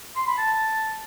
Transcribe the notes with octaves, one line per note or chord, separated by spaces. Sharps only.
C6
B5
A5